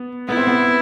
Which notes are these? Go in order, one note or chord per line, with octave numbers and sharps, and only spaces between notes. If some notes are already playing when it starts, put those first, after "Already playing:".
Already playing: B3
B3 E4
C4
B3